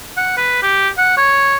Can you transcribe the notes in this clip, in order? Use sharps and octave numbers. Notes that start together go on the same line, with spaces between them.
F#5
B4
G4
F#5
C#5